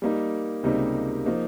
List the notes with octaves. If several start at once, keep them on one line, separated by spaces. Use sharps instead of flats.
G3 A#3 D#4
C#2 C3 G3 A#3 D#4
F3 A#3 D#4